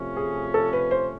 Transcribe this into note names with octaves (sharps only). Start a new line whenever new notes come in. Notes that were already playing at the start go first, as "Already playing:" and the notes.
Already playing: C3 F3 A3 C#4
G#4
A4
B4
C5